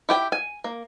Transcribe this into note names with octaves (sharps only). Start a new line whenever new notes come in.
E4 G4 G5
G#5
A#3